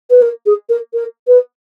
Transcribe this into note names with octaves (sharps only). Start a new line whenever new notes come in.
B4
A#4
G#4
A#4
A#4
B4